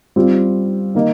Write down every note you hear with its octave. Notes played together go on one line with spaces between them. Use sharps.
G3 C4 F4
D#3 A#3 D#4